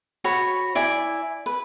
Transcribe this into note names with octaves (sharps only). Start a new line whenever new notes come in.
F#4 C#5 B5
E4 D5 G#5
B4